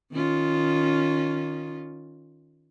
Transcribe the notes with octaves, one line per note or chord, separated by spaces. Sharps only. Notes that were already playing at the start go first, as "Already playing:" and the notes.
D#3 C#4 F4